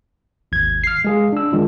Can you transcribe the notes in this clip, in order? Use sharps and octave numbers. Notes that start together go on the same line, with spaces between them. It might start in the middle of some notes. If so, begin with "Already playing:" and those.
G#1 D#2 G#6
F6 C7
G#3 G#4 F5
D4 E6
D#3 G#3 D4 F4